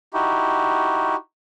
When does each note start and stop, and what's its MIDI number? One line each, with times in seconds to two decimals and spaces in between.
0.14 1.15 63
0.14 1.15 64
0.14 1.15 66
0.14 1.15 67